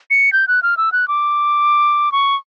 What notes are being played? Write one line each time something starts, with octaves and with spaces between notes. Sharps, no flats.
C#7
G6
F#6
F6
E6
F#6
D6
C#6